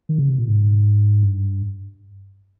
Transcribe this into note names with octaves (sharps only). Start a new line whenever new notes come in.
D#3
C#3
C3
A#2
G#2
G2